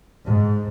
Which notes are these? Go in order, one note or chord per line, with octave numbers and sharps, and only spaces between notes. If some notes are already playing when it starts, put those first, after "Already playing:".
G#2